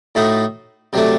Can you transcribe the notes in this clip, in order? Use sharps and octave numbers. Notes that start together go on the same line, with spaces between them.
A2 A3 D#4 F#4
C3 F#3 A3 D4